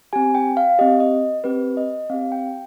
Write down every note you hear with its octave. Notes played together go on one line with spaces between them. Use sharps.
C4 G4 G#5
G5
F5
C4 G4 D#5
D#5
C4 G4 B4
D#5
C4 G4 F5
G5